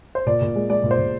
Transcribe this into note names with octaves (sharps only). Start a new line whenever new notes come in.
C5
A#2 D5
A#2
G#3
G#3 D5
A#2
C5
A#2